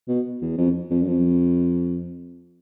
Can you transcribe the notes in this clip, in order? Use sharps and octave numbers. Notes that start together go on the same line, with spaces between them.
B2
E2
F2
F2
F#2
F2